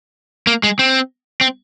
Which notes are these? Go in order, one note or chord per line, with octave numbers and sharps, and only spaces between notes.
A#3
G#3
C4
C4